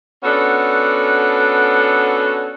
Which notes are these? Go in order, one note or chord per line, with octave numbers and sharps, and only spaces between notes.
B3 C#4 D4 F#4 A4